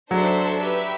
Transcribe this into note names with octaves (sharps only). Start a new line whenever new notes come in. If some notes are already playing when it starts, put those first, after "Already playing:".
F#3 D4 A4 C5 E5 A5
G4 B4 E5